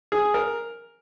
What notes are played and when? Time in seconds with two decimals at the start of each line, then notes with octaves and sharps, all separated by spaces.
0.12 G#4
0.34 A#4